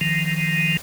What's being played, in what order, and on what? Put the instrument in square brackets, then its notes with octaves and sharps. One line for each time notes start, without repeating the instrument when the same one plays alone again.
[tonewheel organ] D#3 F3